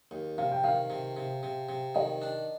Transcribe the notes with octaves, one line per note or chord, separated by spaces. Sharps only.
D#2
C3 F5
G5
D#3 F5
C3
C3
C3
C3
D#3 D#5
D4